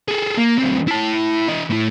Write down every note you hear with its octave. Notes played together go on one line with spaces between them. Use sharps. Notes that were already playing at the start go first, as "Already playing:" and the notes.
G#4 A4
A#3
D2 C4
E4 A5
E3 D#5
A2 E4